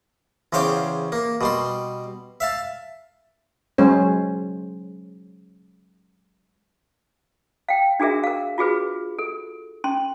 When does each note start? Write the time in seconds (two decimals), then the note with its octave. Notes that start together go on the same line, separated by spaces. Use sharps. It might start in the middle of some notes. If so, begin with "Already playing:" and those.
0.53 E2 C#3 C5 F5 G5 D6
1.12 A#3
1.41 B2 G3 C6
2.40 E5 F5 A5
3.78 F#3 G#3 C#4 C5
7.69 F5 G5
8.00 D4 F#4 G#4 A#4 E5
8.24 A#4 F5
8.58 F4 F#4 G#4 B4
9.19 A4
9.84 C#4 C6